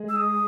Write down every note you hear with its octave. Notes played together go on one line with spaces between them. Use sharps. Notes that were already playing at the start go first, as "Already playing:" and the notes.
Already playing: G#3
E6
D#6